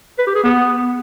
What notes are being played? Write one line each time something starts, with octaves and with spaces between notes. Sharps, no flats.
B4
G4
G#4
B3